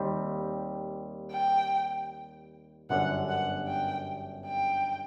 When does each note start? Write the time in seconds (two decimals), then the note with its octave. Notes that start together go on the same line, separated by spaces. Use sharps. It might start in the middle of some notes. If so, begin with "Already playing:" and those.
Already playing: D#2 D#3 G3 C4
1.31 G5
2.90 G1 F#2 D3 F#5
3.29 F#5
3.68 G5
4.47 G5